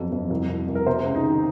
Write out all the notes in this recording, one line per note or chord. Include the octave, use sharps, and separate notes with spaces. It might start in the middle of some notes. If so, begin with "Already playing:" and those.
Already playing: F2 F#3
F2
C2
C2
C2
A#4
C3 C5
C#2
D#4
D#3